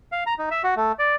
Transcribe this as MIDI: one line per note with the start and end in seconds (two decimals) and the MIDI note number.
0.12 0.24 77
0.26 0.34 82
0.39 0.49 63
0.51 0.62 76
0.64 0.74 66
0.76 0.92 57
0.99 1.16 74